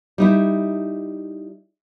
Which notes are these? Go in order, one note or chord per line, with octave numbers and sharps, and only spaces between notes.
G3 D#4 E4